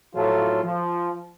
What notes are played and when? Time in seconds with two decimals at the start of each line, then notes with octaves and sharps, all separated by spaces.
0.15 A2 F3 F#3 F4 A4
0.63 F3